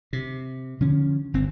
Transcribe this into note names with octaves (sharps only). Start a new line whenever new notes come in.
C3
D3 F3 C#4
G1 C4